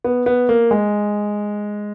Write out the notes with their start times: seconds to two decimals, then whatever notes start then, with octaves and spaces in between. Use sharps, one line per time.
0.04 B3
0.26 B3
0.49 A#3
0.71 G#3